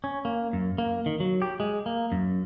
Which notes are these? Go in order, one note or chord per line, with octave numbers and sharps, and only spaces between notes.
C#4
A#3
F#2
A#3
D#3
F#3
G4
G#3
A#3
F#2